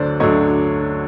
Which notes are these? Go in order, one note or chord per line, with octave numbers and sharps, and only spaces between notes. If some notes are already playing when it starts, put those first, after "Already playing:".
Already playing: D2 D3 F#3 A3 C5 D5
D2 D3 F#3 A3 C#5 D#5